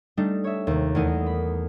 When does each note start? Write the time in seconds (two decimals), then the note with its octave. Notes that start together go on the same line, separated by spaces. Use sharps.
0.17 G3 A3 D4 D#4
0.44 C#5 E5
0.67 D#2 C3
0.95 E2 A3 B3 D#4 A#4 D#7
1.26 B5